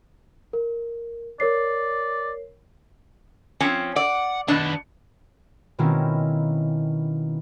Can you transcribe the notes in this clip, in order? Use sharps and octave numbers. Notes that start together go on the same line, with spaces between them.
A#4
A#4 C#5 D5 C7
F3 C4 C#4
D5 F#5
B2 D#3 B3 D4
B2 D#3 A#3 C4 C#4 E4